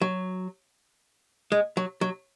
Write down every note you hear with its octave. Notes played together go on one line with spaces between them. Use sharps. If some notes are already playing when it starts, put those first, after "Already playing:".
F#3
G#3
F#3
F#3